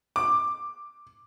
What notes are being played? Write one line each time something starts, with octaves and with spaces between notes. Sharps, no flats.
D6